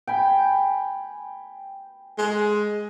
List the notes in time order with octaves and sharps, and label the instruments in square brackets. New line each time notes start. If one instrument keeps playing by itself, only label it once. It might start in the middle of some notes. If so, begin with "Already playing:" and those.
[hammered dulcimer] G5 G#5 B5
[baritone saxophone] G#3